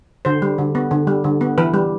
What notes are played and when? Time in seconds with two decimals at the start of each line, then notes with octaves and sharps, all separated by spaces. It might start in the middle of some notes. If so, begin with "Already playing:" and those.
0.25 D3 C5
0.42 G3
0.58 D3
0.75 B3
0.91 D3
1.07 G3
1.24 D3
1.41 B3
1.58 E3 B4
1.74 G3